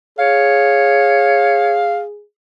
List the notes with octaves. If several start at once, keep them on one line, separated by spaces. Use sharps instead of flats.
G#4 C#5 F5